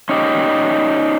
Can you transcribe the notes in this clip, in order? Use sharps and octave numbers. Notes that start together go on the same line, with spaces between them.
C#4 D#4 G4